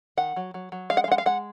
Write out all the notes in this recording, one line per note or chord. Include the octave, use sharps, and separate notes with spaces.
D#3 F#5
F#3
F#3
F#3
G#3 F5
F#5
F5
G#3 F#5
F5
G#3 F#5